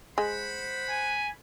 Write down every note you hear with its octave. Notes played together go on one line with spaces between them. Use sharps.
G#3 C5 F#5 B5
G#5